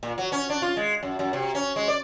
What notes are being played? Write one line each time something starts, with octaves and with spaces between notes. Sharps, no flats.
A#2
F#3
C#4
D4
F4
G#3
F#2
F#2
C3
C#4
G#3
D5